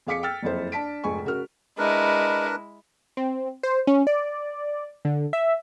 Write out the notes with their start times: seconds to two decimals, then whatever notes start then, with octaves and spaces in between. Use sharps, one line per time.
0.07 F2 G#4 F5 D6 B6 C#7
0.23 G5 E6 F6 A6
0.42 F#1 F2 E4 C5
0.72 D4 A5 B6 D7
1.04 F1 G#2 G#5 C#6
1.25 C#3 F#4 A#4 F6
1.78 G#3 D4 E4 A#4 B4
3.17 C4
3.63 C5
3.87 C#4
4.07 D5
5.05 D3
5.33 E5